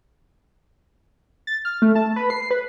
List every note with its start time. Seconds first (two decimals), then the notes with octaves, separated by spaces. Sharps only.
1.47 A6
1.65 F6
1.82 A3
1.95 A5
2.16 B4
2.30 C7
2.51 B4